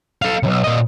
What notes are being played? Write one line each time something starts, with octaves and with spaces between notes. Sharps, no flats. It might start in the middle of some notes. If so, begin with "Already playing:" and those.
A4 F5
B1 C#3
A#2 D#5